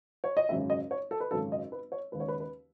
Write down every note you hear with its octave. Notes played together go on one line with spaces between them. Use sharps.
C#5
D#5
G#1 F#2 C#3 G#3 E5
D#5
C#5
A4
B4
G#1 F#2 C#3 G#3 A4
D#5
B4
C#5
D#2 C#3 G#3 B4
C#5
B4
B4